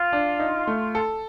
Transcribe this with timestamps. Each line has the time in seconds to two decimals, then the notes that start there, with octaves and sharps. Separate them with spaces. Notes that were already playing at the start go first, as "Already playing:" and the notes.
Already playing: F4
0.13 D4
0.39 D#4
0.67 A3
0.95 A4